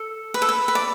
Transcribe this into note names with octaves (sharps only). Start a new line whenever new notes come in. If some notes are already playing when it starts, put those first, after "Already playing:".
Already playing: A4
B4
A4
B4
B4
D5